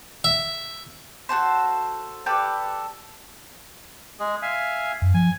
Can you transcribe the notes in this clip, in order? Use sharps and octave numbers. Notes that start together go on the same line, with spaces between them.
E5
F#4 G4 A4 C5
G4 A4 B4 D5
G#3 G#4
E5 F5 G#5
F#2
F3 G#5